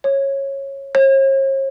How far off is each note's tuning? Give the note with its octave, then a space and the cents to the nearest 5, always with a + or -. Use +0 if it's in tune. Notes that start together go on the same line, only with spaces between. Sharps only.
C#5 -15
C#5 -45